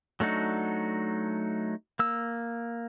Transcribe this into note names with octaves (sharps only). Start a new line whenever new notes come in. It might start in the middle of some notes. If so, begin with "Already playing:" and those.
F#3 A3 D4 D#4 F#4
A#3 E6